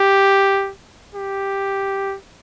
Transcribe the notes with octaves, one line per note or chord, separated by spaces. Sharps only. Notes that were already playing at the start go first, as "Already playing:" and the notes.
Already playing: G4
G4